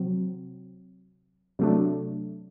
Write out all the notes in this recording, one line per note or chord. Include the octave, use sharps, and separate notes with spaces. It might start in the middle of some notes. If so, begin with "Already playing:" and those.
Already playing: C3 F#3 C4
C3 F#3 A3 D4